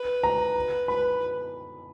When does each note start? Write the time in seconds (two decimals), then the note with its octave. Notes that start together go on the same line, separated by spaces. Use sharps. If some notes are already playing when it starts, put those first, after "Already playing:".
Already playing: B4
0.23 A#5
0.88 B4 B5